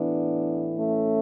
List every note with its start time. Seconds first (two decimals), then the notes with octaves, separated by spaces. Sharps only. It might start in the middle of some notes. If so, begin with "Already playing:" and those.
Already playing: A2 E3 B3 D4
0.77 A3 C#4